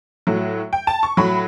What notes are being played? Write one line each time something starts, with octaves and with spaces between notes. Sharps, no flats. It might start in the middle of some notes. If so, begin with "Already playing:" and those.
A2 F#3
G5
A5
C#6
A2 F#3 B5